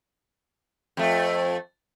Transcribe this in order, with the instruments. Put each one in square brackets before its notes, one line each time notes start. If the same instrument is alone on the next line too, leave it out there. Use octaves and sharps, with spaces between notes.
[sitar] F2 A3